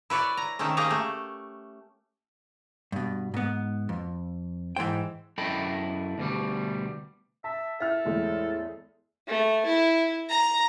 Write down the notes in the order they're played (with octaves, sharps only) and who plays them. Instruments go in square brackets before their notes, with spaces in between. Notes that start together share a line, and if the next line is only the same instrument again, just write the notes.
[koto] E4 B4 C#5 D5
A#5
D#3 A3 C4 C#4
A#3 C#4 G4 G#4 A#5
A3
[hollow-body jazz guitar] G2 B2
G#2 B3
F2
G#2 E3 G#3 C5 G5
[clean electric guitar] F#2 E4 A4 D#5 G5 B5
D2 B2 G3
[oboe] E5 [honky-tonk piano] A5
[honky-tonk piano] E4 F6 [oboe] A4 [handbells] E5
[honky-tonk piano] E2 G#3 A3 [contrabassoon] A2
[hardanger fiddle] A3
E4
A#5